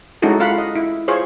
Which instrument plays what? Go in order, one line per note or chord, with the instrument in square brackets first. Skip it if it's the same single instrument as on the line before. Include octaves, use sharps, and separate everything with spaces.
[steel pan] G#3 C#4 D#4 E4 F#4 A4
F4 F5 F#5 B5
D#5
E4
F4 G#4 C5 C#5